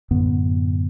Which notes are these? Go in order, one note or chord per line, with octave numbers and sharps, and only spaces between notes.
F#2 A2 D3 B3